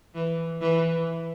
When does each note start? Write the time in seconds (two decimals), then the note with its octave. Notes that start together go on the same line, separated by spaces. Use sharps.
0.14 E3
0.61 E3